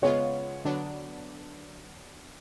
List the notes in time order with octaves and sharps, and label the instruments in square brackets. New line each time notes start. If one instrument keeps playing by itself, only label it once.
[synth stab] C#3 G#3 B3 F4 [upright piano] C#5
[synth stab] D3 F#3 B3 D4